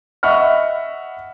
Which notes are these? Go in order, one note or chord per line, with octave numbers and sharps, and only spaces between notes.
D#5 E5 F#5 B5 C#6 F6